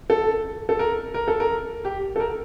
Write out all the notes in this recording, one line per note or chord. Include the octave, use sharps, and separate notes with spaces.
A4
A4
A#4
A#4
A4
A#4
G4
A4
A#4